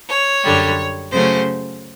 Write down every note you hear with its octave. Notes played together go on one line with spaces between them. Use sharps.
C#5
F#2 D3 G3
C#3 F#3 A3 C#4 C5